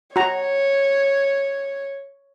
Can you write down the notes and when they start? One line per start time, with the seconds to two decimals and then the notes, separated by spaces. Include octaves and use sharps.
0.16 F#4 C#5 A#5